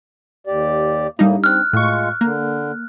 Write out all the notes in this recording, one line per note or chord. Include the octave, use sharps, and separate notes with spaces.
D#2 G4 D5
A2 G3 A#3 D4 D#4
C4 F6 F#6
A2 G#3 F4 C#6
D3 A#3